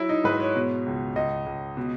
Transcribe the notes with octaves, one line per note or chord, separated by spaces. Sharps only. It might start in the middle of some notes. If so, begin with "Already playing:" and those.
Already playing: F#3 E4
D#4
G#2 B4
C#5
B2
C#2
C#2 D#5
C#2
B2